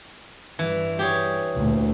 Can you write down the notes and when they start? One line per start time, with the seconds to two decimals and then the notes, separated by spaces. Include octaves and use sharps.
0.59 G2 E3
0.99 G4 G#4 C#5
1.58 D2 A#2